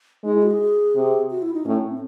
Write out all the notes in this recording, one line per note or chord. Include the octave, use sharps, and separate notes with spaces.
G#3 D#4
E4
F#4
G#4
C3
F#4
E4
D#4
A2 C#4
C4